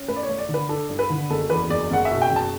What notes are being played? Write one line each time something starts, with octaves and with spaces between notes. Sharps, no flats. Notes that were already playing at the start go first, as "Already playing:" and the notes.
Already playing: C#4
A3 B4
D5
C#5
A3
D5
D3
B4
D4 A4
G2
B4
D3
F#1 A4
E2 B4
F#1 D5
F#1 F#5
E5
B2
G5
F#1
A5